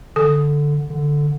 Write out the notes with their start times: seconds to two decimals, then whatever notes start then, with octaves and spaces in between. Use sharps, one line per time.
0.16 D3 A4
0.90 D3